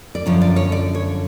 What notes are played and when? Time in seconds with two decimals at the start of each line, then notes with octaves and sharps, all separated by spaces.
0.15 D5
0.26 F#2 D3 F3 C#5
0.41 D5
0.56 C#5
0.72 D5
0.95 C#5